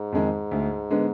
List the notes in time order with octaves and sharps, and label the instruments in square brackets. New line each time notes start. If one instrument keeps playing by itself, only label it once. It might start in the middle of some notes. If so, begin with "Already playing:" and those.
Already playing: [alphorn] G#2
[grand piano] F2 D#3 G#3 D#4
D2
D3 G#3 B3